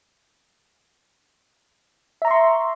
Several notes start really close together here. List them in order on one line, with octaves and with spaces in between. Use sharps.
E5 A#5 C#6 C6